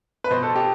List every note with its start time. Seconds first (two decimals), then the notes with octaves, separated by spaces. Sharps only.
0.24 B4
0.30 B2 C5
0.43 A4
0.55 G4